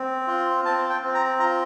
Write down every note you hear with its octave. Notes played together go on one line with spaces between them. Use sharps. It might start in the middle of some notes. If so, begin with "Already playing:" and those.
Already playing: C4
F4
C4 A5
G5
C4
A#5
F4 A#5